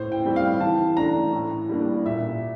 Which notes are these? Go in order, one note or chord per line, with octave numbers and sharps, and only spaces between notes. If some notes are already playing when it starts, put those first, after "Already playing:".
Already playing: A2 C5
G5
G3 C4
F5
E3 A5
A3 D4 A#5
A2
G3 A#3 D4
A#2 E5